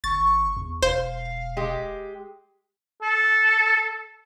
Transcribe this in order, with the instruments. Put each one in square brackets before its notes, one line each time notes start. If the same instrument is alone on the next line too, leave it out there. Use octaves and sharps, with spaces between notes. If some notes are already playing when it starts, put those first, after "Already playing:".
[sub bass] G1 [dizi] C#6 [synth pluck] A6
[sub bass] E2
[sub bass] E1 [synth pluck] C5 [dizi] F5
[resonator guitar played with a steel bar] G#3 G4
[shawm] A4